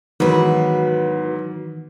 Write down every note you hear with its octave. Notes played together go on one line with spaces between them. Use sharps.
G#2 D#3 E3 F#3 B3 F#4 B4